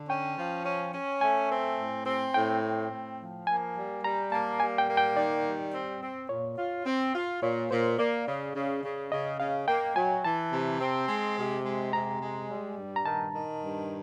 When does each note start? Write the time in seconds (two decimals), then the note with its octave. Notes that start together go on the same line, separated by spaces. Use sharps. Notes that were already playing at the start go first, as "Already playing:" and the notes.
Already playing: D3
0.09 C#4 G5
0.38 F3
0.65 C#4
0.94 C#4
1.21 A3 G#5
1.50 C4
1.79 A2
2.06 C4
2.34 A2 G5
2.63 C4
2.91 A2
3.20 F3
3.47 A#3 G#5
3.76 G3
4.04 G3 A#5
4.32 A#3 A5
4.60 G3 G#5
4.78 G5
4.88 A#3
4.97 G5
5.17 D#3 D5
5.44 G3
5.73 C4
6.01 C4
6.29 A#2 C#5
6.57 F4
6.86 C4
7.14 F4
7.42 A#2 C#5
7.70 A#2 C5
7.98 A#3 D5
8.27 C#3
8.55 C#3
8.83 C#3
9.11 C#3 D#5
9.40 C#3 F5
9.68 A#3 G5
9.96 F#3 G#5
10.24 E3 A5
10.53 C3
10.80 C4
11.08 G#3
11.37 C3
11.64 G#3
11.93 C3 A#5
12.21 G#3
12.50 G3
12.78 G2
12.96 A#5
13.06 D#3 A5
13.35 D#3
13.63 G2